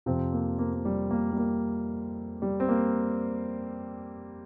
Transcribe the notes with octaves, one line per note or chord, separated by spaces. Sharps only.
F2 C3 F3 C4
A#3
A#3
A#3
G3
A#3
G3
A#3
G3
C4
A#3